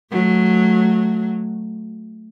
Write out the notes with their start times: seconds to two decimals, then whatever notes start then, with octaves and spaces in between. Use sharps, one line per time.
0.11 F#3 A3